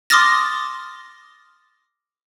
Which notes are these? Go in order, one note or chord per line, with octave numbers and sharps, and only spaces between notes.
C6 D6 D#6 F6 A6 A#6